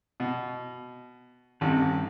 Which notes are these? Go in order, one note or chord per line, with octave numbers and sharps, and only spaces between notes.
B2
A1 G2 C3 D#3